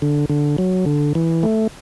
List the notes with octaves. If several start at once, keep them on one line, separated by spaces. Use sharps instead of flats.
D3
D3
F#3
D3
E3
A3